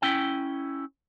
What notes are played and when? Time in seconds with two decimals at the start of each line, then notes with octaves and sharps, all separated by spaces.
0.02 C#4 E4 G5